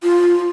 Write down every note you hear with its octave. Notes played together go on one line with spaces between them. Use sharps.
F4